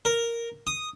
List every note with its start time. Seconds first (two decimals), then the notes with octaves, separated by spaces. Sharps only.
0.05 A#4
0.67 D#6